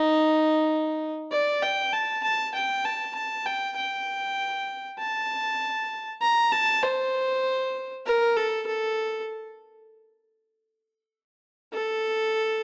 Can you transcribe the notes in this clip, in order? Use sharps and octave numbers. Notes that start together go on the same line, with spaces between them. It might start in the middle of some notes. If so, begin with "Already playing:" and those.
Already playing: D#4
D5
G5
A5
A5
G5
A5
A5
G5
G5
A5
A#5
A5
C5
A#4
A4
A4
A4